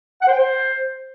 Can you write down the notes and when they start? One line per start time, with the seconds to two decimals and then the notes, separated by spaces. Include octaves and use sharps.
0.22 F#5
0.27 C5
0.32 G5
0.37 C5